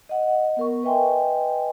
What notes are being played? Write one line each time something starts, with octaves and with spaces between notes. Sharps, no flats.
D#5 F#5
B3 A#4 C#6
B4 D#5 E5 G5 G#5 C6